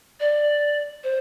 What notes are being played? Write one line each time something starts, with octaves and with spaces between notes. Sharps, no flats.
D5
C5